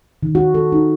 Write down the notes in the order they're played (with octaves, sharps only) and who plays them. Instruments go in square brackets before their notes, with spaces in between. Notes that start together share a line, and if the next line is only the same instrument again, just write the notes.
[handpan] D#3
F#4
A4
D#4